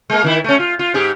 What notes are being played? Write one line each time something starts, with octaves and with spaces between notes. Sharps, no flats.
G#3 A#3
D#3 E4
A3 C#4
F4
F4
G#2 G4 G#4